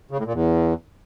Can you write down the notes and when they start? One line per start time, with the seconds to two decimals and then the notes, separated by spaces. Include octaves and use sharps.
0.11 C#3
0.18 A2
0.26 A#2
0.33 E2